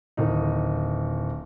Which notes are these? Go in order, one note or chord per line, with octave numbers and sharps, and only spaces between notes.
D1 D#3 D#4